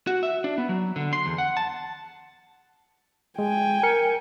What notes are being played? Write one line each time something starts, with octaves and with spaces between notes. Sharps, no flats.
F#4
E5
D4
B3
F#3
D3
C6
E2
F#5
A5
G#3 G5 G#5
A#4 C#7